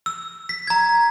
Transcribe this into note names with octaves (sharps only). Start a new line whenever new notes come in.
E6
B6
A#5 G#6